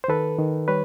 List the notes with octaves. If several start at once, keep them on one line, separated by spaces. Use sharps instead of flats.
C5
D#3 A4 B4
D#3
G3 B4 C#5